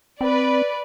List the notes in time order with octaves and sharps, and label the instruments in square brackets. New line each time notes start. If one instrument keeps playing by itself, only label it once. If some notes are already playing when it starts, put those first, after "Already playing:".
[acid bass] C4 [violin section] B4 D5